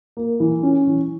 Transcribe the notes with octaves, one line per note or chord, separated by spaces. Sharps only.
A#3
E3
C#4
E3